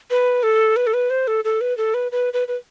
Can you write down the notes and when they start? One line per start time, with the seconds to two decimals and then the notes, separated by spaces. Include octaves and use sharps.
0.10 B4
0.43 A4
0.76 B4
0.87 A4
0.94 B4
1.10 C5
1.28 A4
1.44 A4
1.61 B4
1.78 A4
1.94 B4
2.12 B4
2.33 B4
2.48 B4